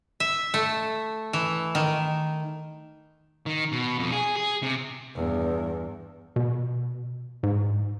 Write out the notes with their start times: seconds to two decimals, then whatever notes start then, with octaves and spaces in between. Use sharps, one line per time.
0.20 E5
0.54 A3
1.33 E3
1.75 D#3
3.46 D#3
3.72 B2
3.99 F2
4.12 G#4
4.36 G#4
4.63 C3
5.15 E2 G2
6.36 B2
7.43 G#2